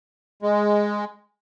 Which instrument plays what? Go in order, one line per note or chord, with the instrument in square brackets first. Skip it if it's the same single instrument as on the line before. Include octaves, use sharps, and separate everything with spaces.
[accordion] G#3